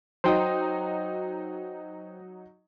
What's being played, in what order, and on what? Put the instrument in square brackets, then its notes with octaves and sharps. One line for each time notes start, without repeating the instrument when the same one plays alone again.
[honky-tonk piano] F#3 D#4 [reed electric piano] C5 G5 D#6